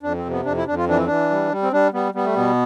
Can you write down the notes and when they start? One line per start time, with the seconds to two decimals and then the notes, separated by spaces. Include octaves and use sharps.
0.03 F2 D4
0.18 C4
0.25 C3
0.31 B3
0.45 F2 D4
0.57 E4
0.67 F2 D4
0.78 F4
0.88 E3 D4
0.97 C4
1.06 E3 D4
1.30 G3
1.51 G3
1.62 C4
1.73 G3 D4
1.93 G3 B3
2.14 G3 B3
2.25 A3
2.35 B2 B3